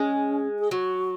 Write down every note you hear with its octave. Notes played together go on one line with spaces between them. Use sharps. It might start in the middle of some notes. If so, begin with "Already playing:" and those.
Already playing: G#3 C#4
G#4
F#3 F#4